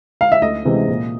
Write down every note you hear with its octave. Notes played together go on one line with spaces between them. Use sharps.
F5
E5
D2 D#5
C3 E3 G#3 C4
A#2